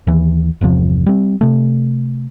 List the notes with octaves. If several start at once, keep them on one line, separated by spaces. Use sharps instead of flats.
D#2 E3
G1 E2 C3 F3
G3 C4
C3 A3